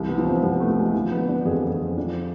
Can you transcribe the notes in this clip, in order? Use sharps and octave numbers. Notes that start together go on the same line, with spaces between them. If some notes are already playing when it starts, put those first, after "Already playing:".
Already playing: C2 E3
B3
F3
C4
C2 B3
A3
F3
G#3
F3
B3
D3
D4
F2 G#4
F2
C4
F3 D4